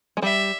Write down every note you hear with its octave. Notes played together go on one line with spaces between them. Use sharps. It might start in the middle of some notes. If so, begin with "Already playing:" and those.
G#3
G3 E5